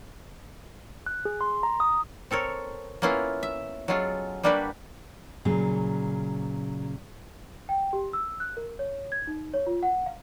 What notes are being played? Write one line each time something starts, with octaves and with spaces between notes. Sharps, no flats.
F#6
G#4
C6
A#5
D#6
C4 A4 A#4 C#5
A#3 B3 C#4 E4 F4
E5
F#3 G#3 C#4 F4 G#4 A4
G3 A#3 D4 F#4 G4 B4
A#2 C#3 F#3
G5
G4
E6
F#6
A#4
C#5
G#6
D#4
C#5
F4
F#5
F5